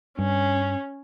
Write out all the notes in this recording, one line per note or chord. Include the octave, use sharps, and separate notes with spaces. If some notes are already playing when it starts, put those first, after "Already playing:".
G2 C#4